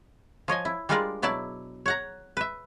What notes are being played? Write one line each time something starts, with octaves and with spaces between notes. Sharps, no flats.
F3 C#5 D#5 G#5
E4
G3 G#3 D4 F4 A#4 D5
B2 F#3 E4 D5 A5
C#5 F#5 A#5
B4 E5